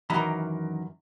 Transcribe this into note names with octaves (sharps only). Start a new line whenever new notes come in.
F#2 D#3 E3 A#5 B5